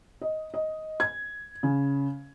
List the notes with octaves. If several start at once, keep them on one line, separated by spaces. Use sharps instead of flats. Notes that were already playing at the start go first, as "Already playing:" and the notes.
D#5
D#5
G#6
C#3